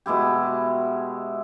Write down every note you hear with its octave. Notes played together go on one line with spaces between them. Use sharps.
B2 G#3 E4 G4